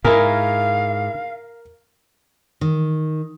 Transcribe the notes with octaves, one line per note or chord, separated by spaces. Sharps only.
G#2 E4 G#4 A#4 F5
D#3